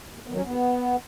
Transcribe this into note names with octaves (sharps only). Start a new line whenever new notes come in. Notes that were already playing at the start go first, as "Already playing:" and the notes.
D#2
D#3 F#3 B3
C#4
D#2 B3